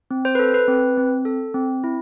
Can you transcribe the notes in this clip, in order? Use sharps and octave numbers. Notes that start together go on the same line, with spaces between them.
C4
C5
A4 B4
B4
C4
C4
A4
C4
E4